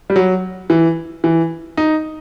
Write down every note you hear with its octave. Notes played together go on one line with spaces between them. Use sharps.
G3
F#3
E3
E3
D#4